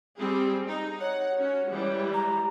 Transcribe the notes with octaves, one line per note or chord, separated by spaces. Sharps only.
G3 C4 G#4
D#4
C#5 F#5
C#4 F#4
E3 G3 G#3
A#5